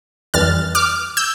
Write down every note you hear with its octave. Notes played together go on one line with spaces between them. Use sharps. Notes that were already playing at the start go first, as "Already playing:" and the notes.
F2 E3 G3 F6 A6
D6 F6
E6 G6